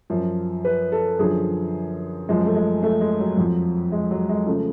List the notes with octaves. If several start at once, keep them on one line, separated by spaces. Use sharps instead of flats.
F#2 F3
B4
A4
F#2 D3 F3 G#4
F#2 F3 G#3
A3
G#3
A3
G#3
F#3
F2 F3
G#3
F#3
G#3
C#3 F3 A3